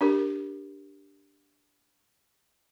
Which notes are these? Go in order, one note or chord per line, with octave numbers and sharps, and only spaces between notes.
D4 G4 A#4